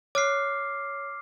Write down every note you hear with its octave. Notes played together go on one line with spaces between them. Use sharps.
C#5 D6 F6 C7